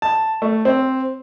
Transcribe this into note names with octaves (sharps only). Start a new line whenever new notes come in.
A5
A3
C4